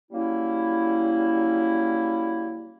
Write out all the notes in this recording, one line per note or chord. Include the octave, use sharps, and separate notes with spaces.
F#3 G3 A#3 C#4 E4